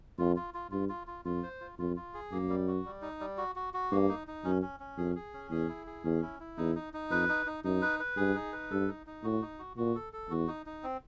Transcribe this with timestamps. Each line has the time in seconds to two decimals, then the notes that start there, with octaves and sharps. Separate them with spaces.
0.18 F2 F4
0.36 F4
0.54 F4
0.71 G2 F4
0.89 F4
1.07 F4
1.25 F2 F4
1.43 C5
1.60 F4
1.79 F2 F4
1.97 F4
2.14 G#4
2.32 F#2 A#3
2.49 G3
2.68 F#4
2.85 G3
3.02 D#4
3.20 G3
3.38 F#4
3.55 F#4
3.74 F#4
3.91 G2 A#3
4.09 D#4
4.27 D#4
4.44 F#2 C#4
4.62 C#4
4.80 C#4
4.98 F2 G#4
5.16 G#4
5.34 C#4
5.51 E2 G#4
5.69 E4
5.87 G#4
6.04 E2 C#4
6.23 E4
6.40 E4
6.57 E2 D#4
6.75 D#4
6.93 D#4
7.10 F2 B4
7.29 D#4
7.46 D#4
7.64 F#2 D#4
7.82 B4
8.00 B4
8.17 G2 G#4
8.35 D#4
8.52 B4
8.71 G2 A4
8.88 D#4
9.07 D#4
9.23 A2 F#4
9.42 D#4
9.59 F#4
9.77 A#2 F#4
9.95 A4
10.13 A4
10.30 E2 F#4
10.48 D#4
10.66 D#4
10.83 C4